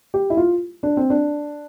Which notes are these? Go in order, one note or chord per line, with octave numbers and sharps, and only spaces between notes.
G4
E4
F4
D4
C4
D4